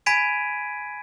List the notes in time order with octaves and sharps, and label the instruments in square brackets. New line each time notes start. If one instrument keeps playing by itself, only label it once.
[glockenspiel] G#5 B5 G#6 B6 D7 D#7